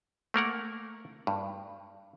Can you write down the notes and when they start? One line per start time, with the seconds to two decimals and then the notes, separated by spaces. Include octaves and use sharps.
0.34 A3 A#3 A#4 F#5
1.27 G2